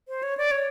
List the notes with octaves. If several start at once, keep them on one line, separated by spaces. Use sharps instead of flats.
C5
C#5
D5
C#5